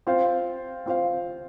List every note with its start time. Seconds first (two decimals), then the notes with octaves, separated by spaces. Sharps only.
0.07 C4 F4 C5 F5
0.86 C4 F4 C5 F5